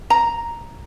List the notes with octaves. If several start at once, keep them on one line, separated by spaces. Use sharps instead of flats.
A#5